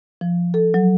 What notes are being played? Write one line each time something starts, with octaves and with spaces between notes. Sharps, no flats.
F3
A4
F#3